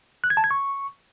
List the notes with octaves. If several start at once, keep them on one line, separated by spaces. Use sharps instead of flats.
F#6
G#6
A5
G#6
C#6